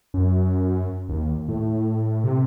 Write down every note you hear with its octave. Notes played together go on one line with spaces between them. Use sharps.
F#2
D#2
A2
C3